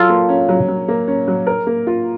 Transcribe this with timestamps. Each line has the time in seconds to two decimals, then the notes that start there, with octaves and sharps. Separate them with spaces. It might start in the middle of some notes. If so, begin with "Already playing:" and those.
Already playing: F#3 F4 A4
0.10 A#3
0.29 C#4
0.49 F#3
0.68 F#3
0.88 A#3
1.08 C#4
1.27 F#3
1.47 A#4
1.67 A#3
1.87 F4